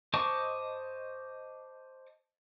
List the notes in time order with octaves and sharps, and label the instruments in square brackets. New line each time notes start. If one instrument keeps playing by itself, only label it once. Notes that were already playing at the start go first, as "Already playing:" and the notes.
[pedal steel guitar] C5 D#5 A5 C#6 D6